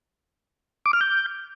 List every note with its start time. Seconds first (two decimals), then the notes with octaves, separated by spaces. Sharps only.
0.86 D6
0.93 F6
1.01 G6